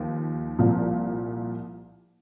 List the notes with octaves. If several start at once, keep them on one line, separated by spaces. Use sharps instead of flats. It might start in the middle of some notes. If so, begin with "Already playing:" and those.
Already playing: D#2 F3
C2 A#2 F3